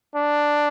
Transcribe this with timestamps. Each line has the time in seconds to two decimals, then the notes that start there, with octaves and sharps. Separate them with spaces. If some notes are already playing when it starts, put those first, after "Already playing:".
0.16 D4